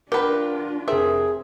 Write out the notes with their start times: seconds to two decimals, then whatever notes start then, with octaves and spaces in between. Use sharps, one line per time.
0.12 D4 F4 G4 A#4 B4 F#5
0.88 F1 C4 G#4 A#4 E5